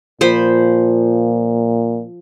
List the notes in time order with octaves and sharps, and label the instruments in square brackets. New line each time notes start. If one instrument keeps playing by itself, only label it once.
[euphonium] A#2 [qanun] F3 C5 B5